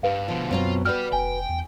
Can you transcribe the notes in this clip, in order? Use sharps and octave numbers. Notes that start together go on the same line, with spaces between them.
G2 B4 F5
B2 D3 F3
F#2 B2 F#3 C4 F4
F#4 G4 B4 D5 F6
F1 G5 G#5
E2